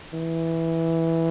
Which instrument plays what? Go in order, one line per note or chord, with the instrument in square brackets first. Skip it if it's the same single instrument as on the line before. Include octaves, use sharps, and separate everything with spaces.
[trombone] E3